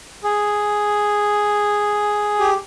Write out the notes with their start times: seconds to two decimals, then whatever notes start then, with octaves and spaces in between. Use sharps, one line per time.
0.24 G#4
2.40 G4